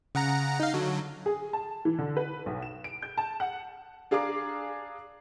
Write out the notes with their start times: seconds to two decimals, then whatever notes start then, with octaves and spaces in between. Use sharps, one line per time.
0.15 C#3 F#5 A#5
0.60 D#4 F5
0.74 D3 F#3
1.26 G#4
1.53 A5
1.85 E3
1.99 D3
2.17 B4
2.46 B1
2.62 E7
2.84 D7
3.02 G6
3.17 A5
3.40 F#5
4.11 D4 G#4 F5 A#5 D6